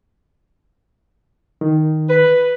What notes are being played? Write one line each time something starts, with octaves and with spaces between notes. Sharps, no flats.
D#3
B4